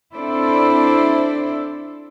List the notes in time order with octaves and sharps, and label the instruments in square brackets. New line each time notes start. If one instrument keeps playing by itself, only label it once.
[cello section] C4 D4 E4 A4 C5 D5